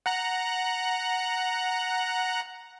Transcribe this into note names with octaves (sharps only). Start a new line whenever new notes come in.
F#5 A#5 F#6